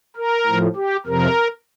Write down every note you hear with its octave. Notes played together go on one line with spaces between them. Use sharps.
A#4
A2 F3
G4
F2 C3 F3 A#4